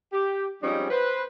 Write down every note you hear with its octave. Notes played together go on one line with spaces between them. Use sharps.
G4
F3 G3 G#3 C4 C#4 D#4
B4 C5